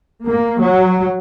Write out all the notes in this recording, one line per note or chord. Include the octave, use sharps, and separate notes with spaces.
A#3
F#3